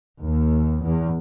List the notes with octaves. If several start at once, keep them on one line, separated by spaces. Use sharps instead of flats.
D#2
E2